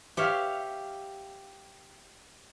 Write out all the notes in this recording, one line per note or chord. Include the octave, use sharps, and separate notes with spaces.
G4 C#5 E5 F5